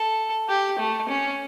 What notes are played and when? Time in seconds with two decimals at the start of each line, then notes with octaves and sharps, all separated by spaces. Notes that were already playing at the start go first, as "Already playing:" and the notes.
Already playing: A4
0.49 G4
0.79 A3
1.09 C#4